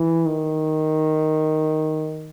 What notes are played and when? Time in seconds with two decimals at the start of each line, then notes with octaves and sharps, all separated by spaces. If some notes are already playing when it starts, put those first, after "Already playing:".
Already playing: E3
0.26 D#3